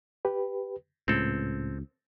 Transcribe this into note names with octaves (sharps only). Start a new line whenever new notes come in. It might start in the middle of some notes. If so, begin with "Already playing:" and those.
G4 B4
C#2 A2 C4 A4